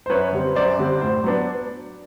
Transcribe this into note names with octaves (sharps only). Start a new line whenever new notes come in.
C5
F#2 B4 C#5
D3 G3 C4
F#2 C5 D5
D3 G3 C4
A2 C5
F#3 B3 D4